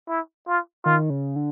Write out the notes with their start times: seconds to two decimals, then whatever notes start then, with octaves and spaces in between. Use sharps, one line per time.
0.09 E4
0.47 F4
0.85 D#3 F4
1.10 C#3
1.36 D3